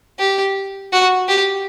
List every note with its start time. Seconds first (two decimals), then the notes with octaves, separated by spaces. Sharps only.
0.19 G4
0.92 F#4
1.28 G4